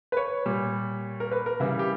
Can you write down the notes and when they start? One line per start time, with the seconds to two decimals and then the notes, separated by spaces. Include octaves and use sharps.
0.12 B4
0.17 C#5
0.46 A#2 G3
1.20 A#4
1.32 B4
1.46 A#4
1.60 C#3 E3 G3 E4
1.79 G4